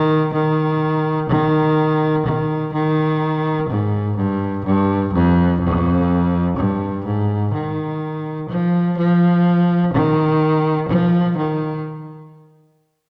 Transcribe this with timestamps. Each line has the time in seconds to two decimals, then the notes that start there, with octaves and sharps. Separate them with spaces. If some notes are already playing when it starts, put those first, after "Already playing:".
Already playing: D#3
0.33 D#3
1.29 D#3
2.25 D#3
2.73 D#3
3.69 G#2
4.17 G2
4.65 G2
5.13 F2
5.61 F2
6.57 G2
7.05 G#2
7.53 D#3
8.49 F3
8.97 F3
9.93 D#3
10.88 F3
11.37 D#3